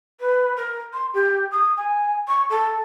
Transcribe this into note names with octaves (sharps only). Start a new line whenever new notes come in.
B4
A#4
C6
G4
D#6
G#5
C#6
A4